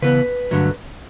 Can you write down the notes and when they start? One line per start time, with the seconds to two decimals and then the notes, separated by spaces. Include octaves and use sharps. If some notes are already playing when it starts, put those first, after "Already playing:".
0.02 C#3 E3 B3 B4
0.51 G2 D3 F#3 A3